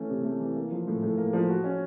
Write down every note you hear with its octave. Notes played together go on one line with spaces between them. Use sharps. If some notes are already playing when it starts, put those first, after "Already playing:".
Already playing: E3 A3 C#4
C3
A3
E3
A#3
F3
A2
A2
A#3
F3
F#4
C#4